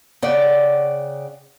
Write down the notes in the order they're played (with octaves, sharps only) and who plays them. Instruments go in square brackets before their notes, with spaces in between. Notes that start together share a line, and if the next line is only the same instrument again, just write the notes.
[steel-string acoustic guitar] C#3 D5 F#5 G5